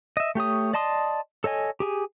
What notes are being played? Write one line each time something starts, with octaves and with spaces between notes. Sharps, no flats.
D#5 E5
A3 G4 C#5 D#6
D5 D#5 A5 C6 D#6
A4 C#5 D#5 G#5
G4 G#4 G#5